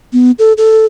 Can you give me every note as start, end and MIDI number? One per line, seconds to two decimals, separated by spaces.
0.13 0.31 59
0.39 0.53 69
0.58 0.86 69